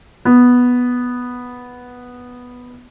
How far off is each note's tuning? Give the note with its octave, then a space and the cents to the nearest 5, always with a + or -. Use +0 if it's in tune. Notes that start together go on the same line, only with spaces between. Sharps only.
B3 -5